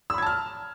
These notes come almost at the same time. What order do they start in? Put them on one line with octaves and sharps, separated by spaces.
E6 B5 G#6 A5 F6